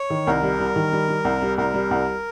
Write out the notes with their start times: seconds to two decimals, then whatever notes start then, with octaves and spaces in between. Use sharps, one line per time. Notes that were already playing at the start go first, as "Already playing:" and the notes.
Already playing: C#5
0.10 D#3
0.27 C2 A#4
0.43 G3
0.60 G3
0.76 D#3
0.92 G3
1.09 G3
1.25 C2
1.42 G3
1.58 C2 A#4
1.74 G3
1.91 C2